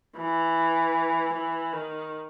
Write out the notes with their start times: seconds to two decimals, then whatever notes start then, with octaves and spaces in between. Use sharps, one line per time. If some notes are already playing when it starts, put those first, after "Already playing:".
0.17 E3
1.33 E3
1.73 D#3